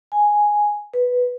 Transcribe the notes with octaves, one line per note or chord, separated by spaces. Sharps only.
G#5
B4